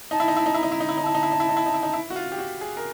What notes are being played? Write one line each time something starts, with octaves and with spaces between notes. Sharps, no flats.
D#4 A5
E4
D#4
E4
D#4
E4 A#5
D#4
E4
D#4
E4
D#4
E4 A5
D#4
E4
D#4
E4
D#4
E4
D#4
E4
D#4
E4
F#4
F4
G4
F#4
G#4
A#4